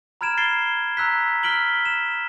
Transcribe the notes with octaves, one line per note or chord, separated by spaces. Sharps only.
A#5 B5 F6 G#6 D7 E7
G#6 A6 C7 D7 G7
A#5 E6 F#6 B6
F6 B6 D7 F#7 G7
E7